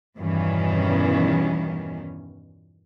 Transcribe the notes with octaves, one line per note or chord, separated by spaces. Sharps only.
E2 G2 B2 D#3 E3 C#4